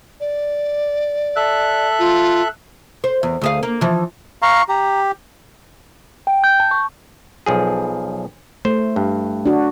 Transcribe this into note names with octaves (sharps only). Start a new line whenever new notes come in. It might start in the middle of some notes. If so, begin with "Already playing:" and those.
D5
A4 E5 F#6
F4
C5
E2
D2 G#4 F5
A#3
E3 F3
F5 A#5 C#6
G4 A#5
G5
G6
A5
C#6
B1 F3 G#4
A3 C5
G2
D4 F#4